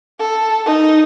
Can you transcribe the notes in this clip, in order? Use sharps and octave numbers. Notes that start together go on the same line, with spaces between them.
A4
D#4